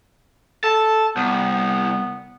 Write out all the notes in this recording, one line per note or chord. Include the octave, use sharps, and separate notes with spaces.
A4 A5
C2 B3